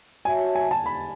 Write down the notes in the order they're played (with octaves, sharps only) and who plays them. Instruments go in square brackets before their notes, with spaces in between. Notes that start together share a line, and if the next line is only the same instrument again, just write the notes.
[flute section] F#4 C#5 E5 A5 [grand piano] G#5
[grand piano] G#5
A5
B5